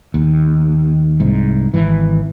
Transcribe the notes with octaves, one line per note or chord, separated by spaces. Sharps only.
D#2
C2 G#2
G#1 E3